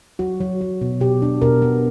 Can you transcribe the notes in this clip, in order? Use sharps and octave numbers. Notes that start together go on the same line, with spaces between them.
F#3 F#4
F#3
F#3
B2
B2 G4
D4
B2 A#4
B3